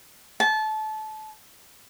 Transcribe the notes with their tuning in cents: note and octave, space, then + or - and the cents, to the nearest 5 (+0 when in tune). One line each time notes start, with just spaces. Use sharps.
A5 -25